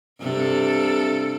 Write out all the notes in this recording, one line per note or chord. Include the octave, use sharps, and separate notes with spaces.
G2 C3 A4